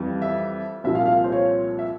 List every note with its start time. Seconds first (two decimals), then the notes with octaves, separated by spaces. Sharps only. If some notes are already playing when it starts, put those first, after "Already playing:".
Already playing: F2 E3 G3
0.22 E5
0.84 C2 A#2 F3 E5
0.95 F5
1.06 F5
1.24 C5
1.32 C#5
1.79 E5